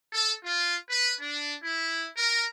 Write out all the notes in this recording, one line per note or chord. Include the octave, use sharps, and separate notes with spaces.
A4
F4
B4
D4
E4
A#4